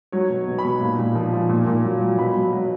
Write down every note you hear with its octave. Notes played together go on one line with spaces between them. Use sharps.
F#3 C#5
B2
B2
B5
B2
A#2
A#2
F3
F3
A#2
A#2
F#3
F#3
B2 B5
F#3
F#3